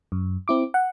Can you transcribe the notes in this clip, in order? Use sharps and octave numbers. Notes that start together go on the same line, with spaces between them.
F#2
C4 E4 D6
F#5